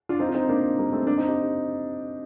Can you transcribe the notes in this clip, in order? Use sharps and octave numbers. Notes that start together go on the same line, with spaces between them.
D4 F4
C4 D#4
F4
C4 D#4
A#3 D4
G3 A#3
A3 C4
A#3 D4
C4 D#4
D#4 G4